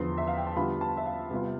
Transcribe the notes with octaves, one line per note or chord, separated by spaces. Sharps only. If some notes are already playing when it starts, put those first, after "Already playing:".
Already playing: E2 D3 F3 B3 C6
E5
F5
G5
A5
D3 G3 B3 F4 B5
A5
E5
F5
C3 G3 B3 F4